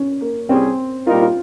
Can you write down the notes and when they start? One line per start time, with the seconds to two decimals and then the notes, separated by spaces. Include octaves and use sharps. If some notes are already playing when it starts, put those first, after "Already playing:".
Already playing: C#4
0.21 A#3
0.49 C2 C3 G3 C4 C#4 G#4
1.07 A#2 G3 A#3 D#4 F4 A#4
1.21 F4